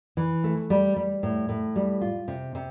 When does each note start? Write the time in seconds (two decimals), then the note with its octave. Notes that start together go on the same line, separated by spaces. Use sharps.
0.17 E3
0.44 A3
0.70 G3
0.96 G3
1.23 A2
1.49 A2
1.76 G3
2.01 F4
2.28 C3
2.55 C3